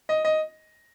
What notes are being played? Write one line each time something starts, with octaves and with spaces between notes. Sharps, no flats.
D#5
D#5